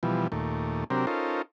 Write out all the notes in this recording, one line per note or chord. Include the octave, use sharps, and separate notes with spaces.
B2 E3 F3 G3
D#2 A#2 A3
C3 F#3 C4 D4 G4 A#4
C#4 D#4 F4 A4 A#4 C5